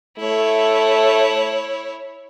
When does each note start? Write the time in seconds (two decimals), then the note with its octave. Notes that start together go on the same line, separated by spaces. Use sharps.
0.19 A3 E4 C#5